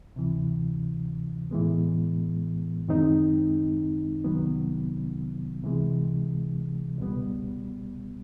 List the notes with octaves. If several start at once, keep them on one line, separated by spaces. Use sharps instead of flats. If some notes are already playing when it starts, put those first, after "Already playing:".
D2 C3 E3
A2 E3 G#3 B3
F#2 D#3 G#3 C4 D#4
C2 C3 D#3 F#3 B3
C#2 C3 E3 G#3
C#2 B2 G3 B3